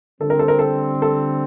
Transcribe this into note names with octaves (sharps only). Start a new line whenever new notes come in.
D3 G3 C4 A4
A#4
A4
A#4
A4
A4